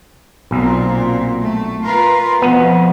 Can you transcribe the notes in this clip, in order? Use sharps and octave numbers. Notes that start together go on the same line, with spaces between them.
B1 A#2 C4
A3
F4 A#4 B4
F2 B2 B3